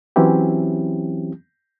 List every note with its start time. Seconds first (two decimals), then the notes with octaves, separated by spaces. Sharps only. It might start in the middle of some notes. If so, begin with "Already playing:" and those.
0.16 E3 F#3 C4 C#4 E4 G4